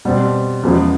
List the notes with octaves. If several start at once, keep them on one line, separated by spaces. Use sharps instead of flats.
B2 G3 C4
E2 C#3 F3 G#3 B3